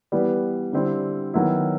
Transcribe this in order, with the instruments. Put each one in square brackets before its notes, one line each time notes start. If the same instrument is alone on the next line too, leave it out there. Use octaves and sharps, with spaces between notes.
[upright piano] E3 G3 B3
D3 G3 C4 E4
D#3 F#3 B3 E4